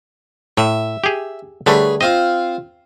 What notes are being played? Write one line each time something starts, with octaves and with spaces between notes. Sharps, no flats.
A2 E5
G4 G#4
D3 G3 A3 G#4 B4 C#5
C4 F4 D#5